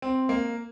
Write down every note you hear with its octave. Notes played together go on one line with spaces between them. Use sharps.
C4
A#3